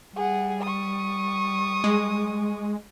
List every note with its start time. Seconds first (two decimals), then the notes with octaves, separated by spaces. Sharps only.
0.16 G3 G#4 F#5
0.62 C#6 D#6
1.84 G#3